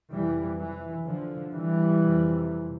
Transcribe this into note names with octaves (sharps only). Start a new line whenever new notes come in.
F2 C3 E3 G3
E3
D3 F3
E3 G3
F2 C3